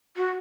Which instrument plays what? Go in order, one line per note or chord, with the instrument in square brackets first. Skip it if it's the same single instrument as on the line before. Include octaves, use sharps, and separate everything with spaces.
[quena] F#4